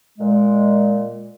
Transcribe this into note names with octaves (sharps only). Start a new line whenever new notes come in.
A#2 G#3